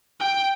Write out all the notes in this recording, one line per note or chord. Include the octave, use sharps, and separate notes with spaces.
G5